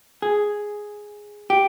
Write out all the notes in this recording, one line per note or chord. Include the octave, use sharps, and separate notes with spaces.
G#4
G4